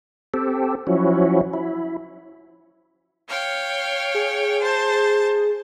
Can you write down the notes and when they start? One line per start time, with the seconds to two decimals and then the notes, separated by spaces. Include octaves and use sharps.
0.34 C4 G4 A4
0.87 F3 F#3 C#4 E4 F#4
1.53 E4
3.28 C#5 F5 G5
4.14 G#4
4.60 C5 A5